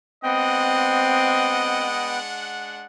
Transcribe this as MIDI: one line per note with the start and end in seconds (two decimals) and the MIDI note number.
0.24 2.86 56
0.24 2.19 59
0.24 1.86 60
0.24 2.86 62
0.24 2.21 75
0.24 2.86 78
0.24 2.19 79